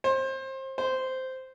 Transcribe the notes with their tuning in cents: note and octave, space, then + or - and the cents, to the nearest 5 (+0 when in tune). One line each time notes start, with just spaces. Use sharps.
C5 +25
C5 -10